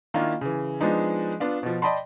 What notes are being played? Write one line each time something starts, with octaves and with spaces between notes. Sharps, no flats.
D#3 A#3 D4 E4 F4
C#3 E3
F3 G#3 B3 D4 D#4
B3 D4 F4
B2 F3
D5 D#5 G5 A5 B5 C6